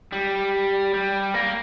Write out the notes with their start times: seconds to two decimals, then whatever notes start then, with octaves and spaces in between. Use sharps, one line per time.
0.12 G3
0.94 G3
1.34 A#3